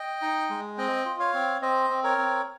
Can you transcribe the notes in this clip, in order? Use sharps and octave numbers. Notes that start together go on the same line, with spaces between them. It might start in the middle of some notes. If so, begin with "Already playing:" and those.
Already playing: D#5 G5
D#4
G#3
C4 D#5 G5
F4
C#5 F5
C4
C4 C5 D#5
C4
A#4 C#5
C4